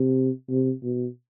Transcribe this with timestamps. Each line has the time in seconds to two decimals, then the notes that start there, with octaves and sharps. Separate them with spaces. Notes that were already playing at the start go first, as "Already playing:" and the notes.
Already playing: C3
0.49 C3
0.83 B2